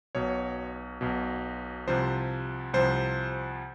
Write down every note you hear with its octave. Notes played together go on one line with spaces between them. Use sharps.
B1 B2 C#5
B1 B2
C2 C3 F3 C5
C2 C3 F3 C5